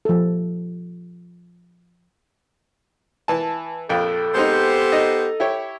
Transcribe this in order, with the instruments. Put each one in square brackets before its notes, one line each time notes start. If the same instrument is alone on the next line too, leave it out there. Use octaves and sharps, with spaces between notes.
[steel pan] F3 A4
[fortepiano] E3 A5
[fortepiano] A#1 F2 G5 [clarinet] A4
[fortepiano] G#3 C4 D#4 [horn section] B3 G4 C5
[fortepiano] D#4 D#5
E4 G4 C#5